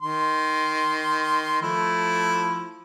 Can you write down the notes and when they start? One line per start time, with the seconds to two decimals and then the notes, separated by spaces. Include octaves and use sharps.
0.01 D#3 C6
1.62 F3 A3 E4